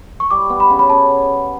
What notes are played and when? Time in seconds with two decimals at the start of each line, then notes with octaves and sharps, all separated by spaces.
0.20 C#6
0.31 G3 D6
0.50 B3
0.60 B5
0.70 C#3
0.79 B5
0.90 C#3 A5